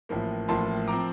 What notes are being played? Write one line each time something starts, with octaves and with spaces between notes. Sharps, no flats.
A1 A2 F3 A#3
A1 A2 F3 A#3 A5 C6
F3 C4 A#5 D6